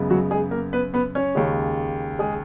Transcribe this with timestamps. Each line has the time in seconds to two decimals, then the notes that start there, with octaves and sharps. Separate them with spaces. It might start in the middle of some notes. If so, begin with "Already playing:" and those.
Already playing: F#2 C#3 G#3 B3
0.10 F#3 F#4
0.31 G#3 G#4
0.51 A#3 A#4
0.73 B3 B4
0.94 B3 B4
1.15 C#4 C#5
1.35 D#2 C#3 G#3
2.19 G#3 G#4